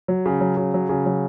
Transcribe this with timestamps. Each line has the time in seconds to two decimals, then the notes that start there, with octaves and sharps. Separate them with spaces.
0.08 F#3
0.26 C#3
0.41 F#3
0.57 C#3
0.74 F#3
0.89 C#3
1.06 F#3